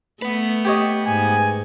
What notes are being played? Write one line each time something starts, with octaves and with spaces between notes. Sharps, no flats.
A3 B3 B4
G4 C#5 D#5
G#2 G#5